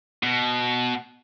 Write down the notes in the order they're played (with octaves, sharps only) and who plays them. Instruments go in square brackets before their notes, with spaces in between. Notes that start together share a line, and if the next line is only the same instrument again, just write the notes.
[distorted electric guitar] B2